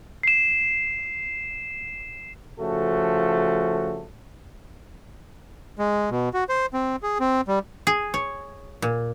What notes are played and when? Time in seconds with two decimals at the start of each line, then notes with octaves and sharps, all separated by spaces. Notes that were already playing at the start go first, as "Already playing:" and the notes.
0.23 C7 E7
2.60 C#3 F3 A3 F#4 A4
5.79 G#3
6.10 B2
6.34 F#4
6.49 C5
6.74 C4
7.03 G#4
7.20 C4
7.48 G3
7.87 G#4
8.14 C#5
8.82 A#2